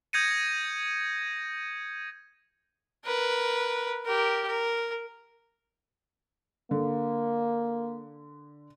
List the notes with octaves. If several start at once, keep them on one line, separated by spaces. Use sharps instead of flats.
D#6 G6 G#6 A#6 C#7 D#7
A#4 B4
G4 A#4
A#4
D3 A#3